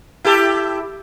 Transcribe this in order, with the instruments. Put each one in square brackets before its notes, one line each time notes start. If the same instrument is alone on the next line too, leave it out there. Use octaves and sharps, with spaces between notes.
[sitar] E4 G4 A4